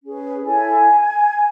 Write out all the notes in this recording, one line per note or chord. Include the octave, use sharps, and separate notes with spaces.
C#4 G#4 B4
E4 A4 C#5 G#5